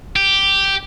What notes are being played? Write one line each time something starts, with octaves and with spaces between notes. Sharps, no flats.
G4